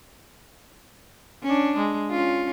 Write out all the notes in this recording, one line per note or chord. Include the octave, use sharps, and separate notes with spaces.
C#4 D4
G#3
C#4 F4